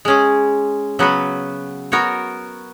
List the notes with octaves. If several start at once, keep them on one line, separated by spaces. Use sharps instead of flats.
G#3 C#4 G#4
C#3 F#3 B3 F#4 B4
B3 F#4 A#4 C#5